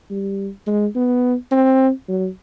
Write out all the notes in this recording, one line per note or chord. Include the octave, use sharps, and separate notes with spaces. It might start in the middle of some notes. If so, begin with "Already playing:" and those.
G3
G#3
B3
C4
F#3